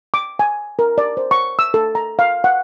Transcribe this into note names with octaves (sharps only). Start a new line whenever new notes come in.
D6
G#5
A#4
D5
C5
C#6
E6
A4
A#5
F5
F#5